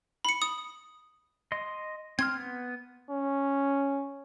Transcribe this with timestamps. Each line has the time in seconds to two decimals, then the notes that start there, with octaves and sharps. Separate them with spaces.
0.25 B5 C#7
0.42 D#6
1.52 D#5 C6
2.19 C4 C6 F6 G#6
2.37 B3
3.11 C#4